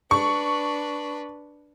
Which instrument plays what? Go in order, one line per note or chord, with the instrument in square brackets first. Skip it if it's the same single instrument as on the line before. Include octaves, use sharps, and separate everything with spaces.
[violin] D4 B4 [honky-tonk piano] C#6